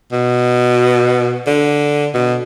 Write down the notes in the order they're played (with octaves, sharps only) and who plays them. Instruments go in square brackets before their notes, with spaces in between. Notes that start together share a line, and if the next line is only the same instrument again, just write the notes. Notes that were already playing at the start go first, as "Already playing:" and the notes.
[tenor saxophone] B2
D3
B2